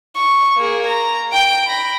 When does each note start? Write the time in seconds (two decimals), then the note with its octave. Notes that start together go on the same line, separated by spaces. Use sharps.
0.16 C#6
0.57 A#3 G#4
0.87 A#5
1.32 G5 D7
1.67 B5 A#6